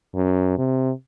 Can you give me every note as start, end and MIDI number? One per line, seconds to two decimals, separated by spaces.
0.15 0.58 42
0.58 0.92 48